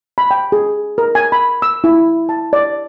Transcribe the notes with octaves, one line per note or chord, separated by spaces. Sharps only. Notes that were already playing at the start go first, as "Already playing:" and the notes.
B5
G5
G#4
A#4
G#5
B5
E6
E4
A5
D5